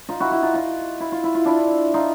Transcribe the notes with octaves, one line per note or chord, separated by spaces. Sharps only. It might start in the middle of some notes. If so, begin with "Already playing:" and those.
D#4 F4
E4 F#4
E4 F#4
D#4 F4
D#4 F4
E4
F4
E4
F4
D4 E4
D#4 F4